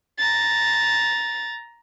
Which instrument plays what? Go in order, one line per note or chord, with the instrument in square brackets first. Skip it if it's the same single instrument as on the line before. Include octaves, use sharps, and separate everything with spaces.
[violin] A#5 A6